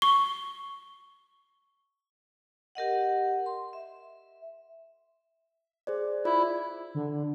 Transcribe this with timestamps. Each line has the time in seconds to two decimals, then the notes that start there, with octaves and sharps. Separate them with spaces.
0.02 C#6 G7
2.75 G4 A#4 D#5 F#5
3.46 C6
3.73 E5
5.87 G#4 C5 D5
6.25 E4 F4 D5
6.95 D3